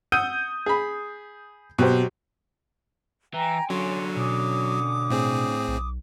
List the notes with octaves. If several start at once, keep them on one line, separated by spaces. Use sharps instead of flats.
F#5 D#6 E6 G6 D#7
G#4 B5
B2 F#3 G4 C5
E3 G5 G#5 A#5
D3 F#3 C#4 C6
B2 D6 D#6
A2 C4 G#4
B1